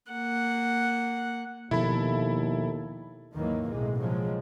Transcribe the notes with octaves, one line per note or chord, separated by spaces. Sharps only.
A#3 F#5
D#2 B2 F3 B3 E4 A4 B5
D#2 G#2 D#3 E3 F#3 A#3
B1 A2 C3 G#3
C#3 F3 F#3 G#3